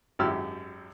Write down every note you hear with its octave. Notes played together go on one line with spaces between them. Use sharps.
G#1 F#2 E4 G4 E6 F6